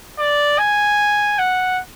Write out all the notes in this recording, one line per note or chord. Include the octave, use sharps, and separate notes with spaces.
D5
G#5
F#5